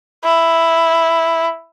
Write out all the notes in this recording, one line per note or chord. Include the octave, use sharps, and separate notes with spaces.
E4